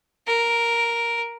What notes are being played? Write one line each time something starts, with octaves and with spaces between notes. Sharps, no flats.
A#4